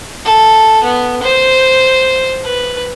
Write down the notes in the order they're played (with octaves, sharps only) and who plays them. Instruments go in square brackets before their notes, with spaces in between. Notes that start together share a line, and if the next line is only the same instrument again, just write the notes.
[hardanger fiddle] A4
B3
C5
B4